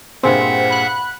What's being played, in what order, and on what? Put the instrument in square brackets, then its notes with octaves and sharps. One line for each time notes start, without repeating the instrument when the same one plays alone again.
[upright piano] G2 A#2 G#4 [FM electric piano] C4 [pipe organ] E5 F#5
[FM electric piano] B5 F#6